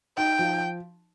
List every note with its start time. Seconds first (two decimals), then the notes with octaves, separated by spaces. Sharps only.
0.17 D#4 G5
0.39 F3